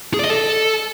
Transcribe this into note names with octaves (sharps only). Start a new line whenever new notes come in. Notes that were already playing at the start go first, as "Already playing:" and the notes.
G#4
D5
D#5
A4